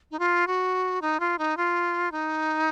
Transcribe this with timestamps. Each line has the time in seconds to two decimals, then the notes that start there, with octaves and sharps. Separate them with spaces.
0.11 D#4
0.19 F4
0.47 F#4
1.02 D#4
1.20 F4
1.38 D#4
1.57 F4
2.12 D#4